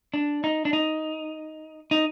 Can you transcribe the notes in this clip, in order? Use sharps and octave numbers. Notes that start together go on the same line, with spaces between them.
D4
D#4
D4
D#4
D#4